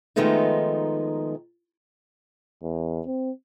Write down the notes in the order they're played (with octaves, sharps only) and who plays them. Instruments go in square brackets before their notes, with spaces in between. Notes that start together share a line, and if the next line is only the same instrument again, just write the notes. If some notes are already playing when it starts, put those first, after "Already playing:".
[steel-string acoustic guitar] D#3 F3 G#3 A3 B3 D#4
[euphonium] E2
C4